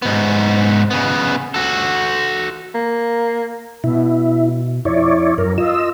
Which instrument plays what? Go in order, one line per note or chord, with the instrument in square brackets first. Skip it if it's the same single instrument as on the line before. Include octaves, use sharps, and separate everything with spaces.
[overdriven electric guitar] G#2 B3
C#3 B3
F#4 A4
[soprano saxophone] A#3
[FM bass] B2 [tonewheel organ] E4
[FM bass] F2 [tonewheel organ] E4 C#5 D5
[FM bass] F#2 [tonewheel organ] A#4
[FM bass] F4 [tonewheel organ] D#5 E6